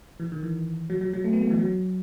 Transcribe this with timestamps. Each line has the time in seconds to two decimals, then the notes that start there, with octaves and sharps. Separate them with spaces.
0.20 E3
0.32 D#3
0.43 E3
0.90 F#3
1.01 F#3
1.13 F#3
1.24 A3
1.33 B3
1.42 A3
1.50 E3
1.59 F#3